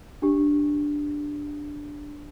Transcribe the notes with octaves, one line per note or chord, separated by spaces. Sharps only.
D4 G4